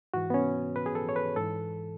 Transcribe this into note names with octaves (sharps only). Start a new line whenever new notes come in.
G#2 E3 F#4
B3
C#4
B4
G#4
A4
C#5
B4
G#2 E3 A4